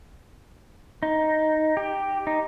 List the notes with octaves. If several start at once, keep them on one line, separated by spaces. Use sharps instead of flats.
D#4
G4
D#4